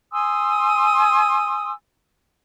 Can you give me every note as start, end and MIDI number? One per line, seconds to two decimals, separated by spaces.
0.12 1.72 80
0.12 1.72 84
0.12 1.72 87
0.12 1.72 88